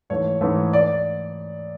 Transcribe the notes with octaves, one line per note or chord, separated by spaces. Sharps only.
G#2 E3 A3 C#5
G#2 E3 A3
D5